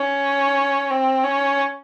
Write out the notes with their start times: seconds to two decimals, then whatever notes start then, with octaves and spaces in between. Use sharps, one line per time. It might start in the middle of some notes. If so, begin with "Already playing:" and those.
Already playing: C#4
0.90 C4
1.24 C#4